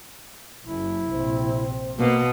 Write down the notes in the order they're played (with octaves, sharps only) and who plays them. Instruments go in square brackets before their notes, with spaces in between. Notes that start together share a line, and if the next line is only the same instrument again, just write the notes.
[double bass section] F#1 F#2 [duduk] E4
[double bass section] A#1 C3 C4
[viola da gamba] B2 [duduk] A#3